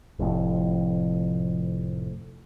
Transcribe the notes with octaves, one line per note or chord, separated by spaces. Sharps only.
F1 F2 A2